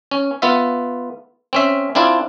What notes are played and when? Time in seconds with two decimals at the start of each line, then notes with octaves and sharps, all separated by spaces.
0.11 C#4
0.42 B3 F4 E5
1.53 C4 C#4 E5
1.95 C4 D4 E4 F4